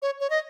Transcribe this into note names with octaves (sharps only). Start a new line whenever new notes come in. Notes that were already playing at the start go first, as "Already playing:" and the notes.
C#5
C#5
D#5